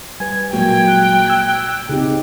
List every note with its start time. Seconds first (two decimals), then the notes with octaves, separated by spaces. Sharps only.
0.20 G3 B4 G#5 G#6
0.53 A#2 F#3 G#3 A#3 F#4 G5
0.87 F#6
1.28 E6 G#6
1.89 C#3 C4 D#4 G4 G#4